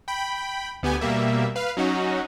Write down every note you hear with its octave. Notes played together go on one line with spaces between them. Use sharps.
G5 B5
D2 B3 G4 G#5
B2 G3 A#3 E5
B4 F5
F#3 C#4 D#4 F#4